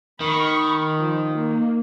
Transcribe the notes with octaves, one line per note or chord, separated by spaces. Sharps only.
D#3 B5 C#6
F3
A#3